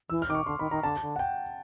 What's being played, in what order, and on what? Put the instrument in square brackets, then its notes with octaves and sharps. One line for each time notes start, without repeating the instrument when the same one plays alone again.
[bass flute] E3 [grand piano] E6
[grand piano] F6
[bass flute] D#3 [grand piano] D6
[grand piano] C#6
[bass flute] D3 [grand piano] C6
[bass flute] D#3 [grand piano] B5
[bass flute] D#3 [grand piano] A#5
[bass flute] D3 [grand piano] A5
[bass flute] D3
[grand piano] F#5
G5